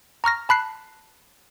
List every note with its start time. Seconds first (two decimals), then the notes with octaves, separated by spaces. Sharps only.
0.24 A#5 C#6 F6 A#6
0.49 A5 B5 F#6 C7